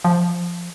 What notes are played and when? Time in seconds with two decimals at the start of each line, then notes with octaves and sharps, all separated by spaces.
0.04 F3